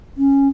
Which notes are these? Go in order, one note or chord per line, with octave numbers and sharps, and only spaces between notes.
C#4